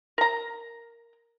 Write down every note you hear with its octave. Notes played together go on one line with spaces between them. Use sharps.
A#4 A#5